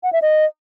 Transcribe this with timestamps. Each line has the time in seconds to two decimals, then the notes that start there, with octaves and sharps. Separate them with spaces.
0.03 F#5
0.12 E5
0.22 D#5